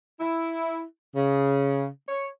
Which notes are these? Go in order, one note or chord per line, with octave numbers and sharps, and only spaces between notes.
E4
C#3
C#5